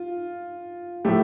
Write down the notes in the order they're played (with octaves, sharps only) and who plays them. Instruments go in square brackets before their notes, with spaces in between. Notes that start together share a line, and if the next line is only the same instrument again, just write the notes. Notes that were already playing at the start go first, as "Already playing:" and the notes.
Already playing: [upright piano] F4
[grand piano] A2 F3 A3 [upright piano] G4